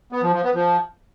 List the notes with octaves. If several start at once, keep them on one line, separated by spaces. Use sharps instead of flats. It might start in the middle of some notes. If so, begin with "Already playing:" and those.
B3
F3
F3
B3
F3